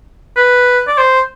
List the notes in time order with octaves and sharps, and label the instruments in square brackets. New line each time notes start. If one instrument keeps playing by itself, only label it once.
[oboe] B4
D5
C5